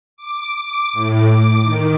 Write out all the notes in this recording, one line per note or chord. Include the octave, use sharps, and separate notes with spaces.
D6
D6
A2
D6
D#3